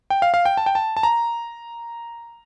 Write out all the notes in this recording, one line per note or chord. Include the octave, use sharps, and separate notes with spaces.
G5
F5
F5
G5
A5
G5
A5
A5
A#5